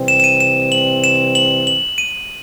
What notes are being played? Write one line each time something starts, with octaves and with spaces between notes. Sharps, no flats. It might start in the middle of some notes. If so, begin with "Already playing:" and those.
Already playing: C3 E3 G3 C4
E7
E7
D#7
E7
F#7
E7
F#7
F#7
D#7